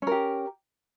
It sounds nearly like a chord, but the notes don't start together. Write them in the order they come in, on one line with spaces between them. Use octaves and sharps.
C#4 A#4 G4